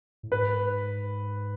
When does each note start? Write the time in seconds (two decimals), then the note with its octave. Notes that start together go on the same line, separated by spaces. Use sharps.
0.23 A2
0.32 G#2 B4